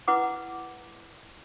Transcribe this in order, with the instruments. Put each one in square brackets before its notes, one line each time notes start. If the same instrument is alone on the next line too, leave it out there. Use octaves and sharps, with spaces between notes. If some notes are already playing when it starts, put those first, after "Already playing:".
[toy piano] E4 B4 F#5 D6